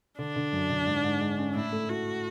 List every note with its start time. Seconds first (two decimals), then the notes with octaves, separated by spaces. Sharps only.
0.19 D3 D4
0.36 D3
0.53 F#2
0.70 D3
0.86 G#2
1.04 G#2
1.21 G#3
1.38 C#4
1.55 A2 E4
1.72 A3
1.89 A3 F#4